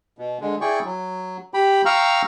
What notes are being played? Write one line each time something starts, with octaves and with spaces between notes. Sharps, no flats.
B2
D3 G#3
E4 G#4 D5 G5 C#6
F#3
G4 G5 B5
F5 G5 A#5 C#6 E6 F6